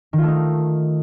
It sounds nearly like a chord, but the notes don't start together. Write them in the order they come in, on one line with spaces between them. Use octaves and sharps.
D#3 F4 A3 D#4